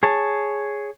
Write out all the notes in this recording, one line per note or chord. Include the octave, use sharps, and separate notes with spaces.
G#4 C#5 A5